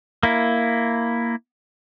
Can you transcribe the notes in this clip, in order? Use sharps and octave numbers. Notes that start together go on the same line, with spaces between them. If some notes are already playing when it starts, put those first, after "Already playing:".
A#3 E4